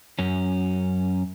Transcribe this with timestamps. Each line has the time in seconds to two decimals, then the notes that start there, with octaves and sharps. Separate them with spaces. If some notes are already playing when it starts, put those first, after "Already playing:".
0.19 F#2 C#4